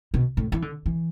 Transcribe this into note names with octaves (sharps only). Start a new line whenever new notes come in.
B2
A2
E3
D3
E3